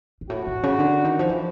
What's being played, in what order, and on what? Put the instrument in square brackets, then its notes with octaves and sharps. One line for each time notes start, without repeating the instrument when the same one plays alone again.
[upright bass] G#2
[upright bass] A2 [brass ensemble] F#4
[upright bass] A2
C#3
D3
D#3
F3
E3